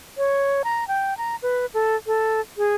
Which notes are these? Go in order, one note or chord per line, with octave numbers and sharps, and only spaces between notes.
C#5
A#5
G5
A#5
B4
A4
A4
G#4